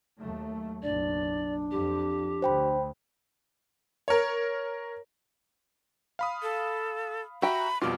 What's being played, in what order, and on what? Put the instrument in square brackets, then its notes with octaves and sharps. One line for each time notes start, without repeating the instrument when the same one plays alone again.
[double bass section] D#2 F#3 A3
[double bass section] F#1 B1 [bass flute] D4 [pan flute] D5
[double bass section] F2 F3 [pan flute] G4
[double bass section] D2 [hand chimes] C5 G5 B5
[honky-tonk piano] A#4 C#5
[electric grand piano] F5 B5 D#6
[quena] A4
[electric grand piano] F#4 E5 A#5 [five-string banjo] G4 G5 [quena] B5
[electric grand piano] F2 B2 G3 [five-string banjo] F4 [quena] D6